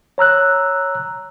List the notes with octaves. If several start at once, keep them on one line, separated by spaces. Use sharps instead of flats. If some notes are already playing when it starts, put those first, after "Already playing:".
C#5 A#5 E6 F#6